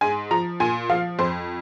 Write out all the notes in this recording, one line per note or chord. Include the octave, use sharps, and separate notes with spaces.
G#2 G#5
F3 A#5
A#2 G#5
F3 F5
F2 C5